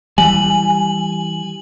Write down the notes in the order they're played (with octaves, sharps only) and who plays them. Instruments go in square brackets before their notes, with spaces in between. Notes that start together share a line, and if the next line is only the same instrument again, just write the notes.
[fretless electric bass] E3 G3 [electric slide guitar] G#5 [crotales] F#7